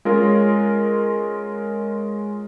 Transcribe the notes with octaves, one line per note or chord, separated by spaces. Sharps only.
G#3 C#4 F4 A#4